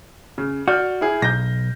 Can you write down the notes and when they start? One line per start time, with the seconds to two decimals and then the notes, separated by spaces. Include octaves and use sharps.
0.38 C#3
0.68 F#4 D5 F6 G6
1.01 E4 G#4
1.22 B1 G6 A#6